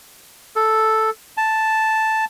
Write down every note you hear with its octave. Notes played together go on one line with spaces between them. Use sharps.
A4
A5